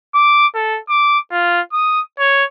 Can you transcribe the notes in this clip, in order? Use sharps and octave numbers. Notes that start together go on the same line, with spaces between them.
D6
A4
D6
F4
D#6
C#5